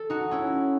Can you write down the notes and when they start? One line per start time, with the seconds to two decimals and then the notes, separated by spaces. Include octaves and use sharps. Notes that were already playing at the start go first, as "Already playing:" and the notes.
Already playing: A4
0.10 D#4 F#4
0.31 C#4 E4